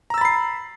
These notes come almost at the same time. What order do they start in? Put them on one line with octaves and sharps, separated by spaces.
A#5 E6 A6 B5 C7